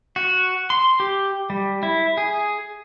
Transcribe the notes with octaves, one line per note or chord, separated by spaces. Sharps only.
F#4
C6
G4
G3
E4
G#4